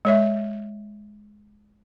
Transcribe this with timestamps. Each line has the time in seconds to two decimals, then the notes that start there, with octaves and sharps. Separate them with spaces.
0.05 G#3 C#5 E5